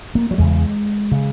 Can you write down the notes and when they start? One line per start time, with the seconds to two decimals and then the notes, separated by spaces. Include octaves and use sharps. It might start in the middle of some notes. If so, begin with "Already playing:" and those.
0.15 A#3
0.31 F#3
0.38 E2 C#3 G#3
1.12 C#3